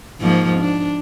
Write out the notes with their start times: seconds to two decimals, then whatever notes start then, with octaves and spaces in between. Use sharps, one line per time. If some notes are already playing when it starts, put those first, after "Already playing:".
0.20 G#2 F3 A#3
0.59 D4